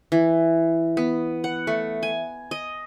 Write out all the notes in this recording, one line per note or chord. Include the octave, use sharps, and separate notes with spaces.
E3
B3
F#5
A3
G#5
D#5